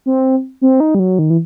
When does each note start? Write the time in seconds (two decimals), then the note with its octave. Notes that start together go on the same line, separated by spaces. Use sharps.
0.06 C4
0.62 C4
0.80 D#4
0.95 G3
0.99 F#3
1.19 D#3
1.30 E3